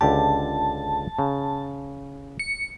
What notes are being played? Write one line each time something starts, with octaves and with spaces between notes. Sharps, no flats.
C#2 D3 G4 A5
C#3
C#7